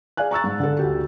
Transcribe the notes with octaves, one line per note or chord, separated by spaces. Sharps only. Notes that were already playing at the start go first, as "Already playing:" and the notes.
G#4 D5 F5 G#5 F#6
A#5 C#6 E6 A6
G#2
D3 A4
D2 G4